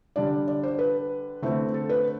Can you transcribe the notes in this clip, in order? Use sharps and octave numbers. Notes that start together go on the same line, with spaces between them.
D3 G3 D4 D5
D5
C5
B4
D3 A3 C4 E4
A4
B4